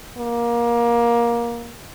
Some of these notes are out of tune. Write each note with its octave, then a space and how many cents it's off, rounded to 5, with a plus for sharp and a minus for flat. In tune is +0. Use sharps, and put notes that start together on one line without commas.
A#3 +20